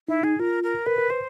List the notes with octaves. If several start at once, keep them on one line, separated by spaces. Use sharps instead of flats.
D#4 E4
D#4 G#4
F4 A#4
A#4
A#4 B4
A#4
B4 C5